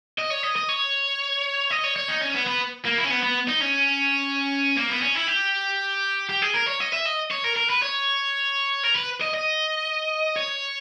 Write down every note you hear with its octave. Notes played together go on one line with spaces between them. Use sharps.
D#5
C#5
D#5
D#5
C#5
D#5
C#5
C#5
D#4
C#4
B3
B3
A#3
E4
C#4
B3
B3
D#4
C#4
A#3
B3
C#4
E4
G4
G4
G#4
A#4
C#5
D#5
E5
D#5
C#5
A#4
A#4
B4
C#5
A#4
B4
D#5
D#5
C#5